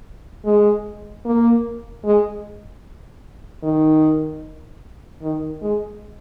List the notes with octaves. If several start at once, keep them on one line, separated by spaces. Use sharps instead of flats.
G#3
A#3
G#3
D#3
D#3
G#3